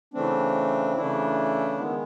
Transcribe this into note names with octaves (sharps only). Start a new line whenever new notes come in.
C#3 E3 A3 C4 D4
C#3 E3 A3 D4 E4
D#3 G#3 B3